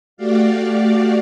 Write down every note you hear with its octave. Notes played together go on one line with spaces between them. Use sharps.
A3 F#4 G4 D5 F5